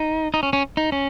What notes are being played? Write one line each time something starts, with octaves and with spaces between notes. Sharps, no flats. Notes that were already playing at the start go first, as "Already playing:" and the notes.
Already playing: D#4
D#4
C#4
C#4
D#4
C#4